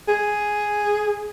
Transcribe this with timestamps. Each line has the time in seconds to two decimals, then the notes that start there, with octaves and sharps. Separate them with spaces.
0.08 G#4